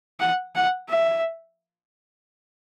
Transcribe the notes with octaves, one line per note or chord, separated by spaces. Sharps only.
F#5
F#5
E5